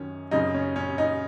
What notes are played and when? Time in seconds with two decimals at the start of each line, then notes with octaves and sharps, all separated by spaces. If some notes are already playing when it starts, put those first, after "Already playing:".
Already playing: F#2 D#3 C#4
0.31 F#2 C#3 D#4
0.54 C#4
0.76 C#4
0.98 D#4